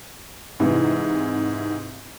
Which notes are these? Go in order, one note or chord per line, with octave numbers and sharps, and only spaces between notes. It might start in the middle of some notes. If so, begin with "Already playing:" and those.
G#2 C3 E3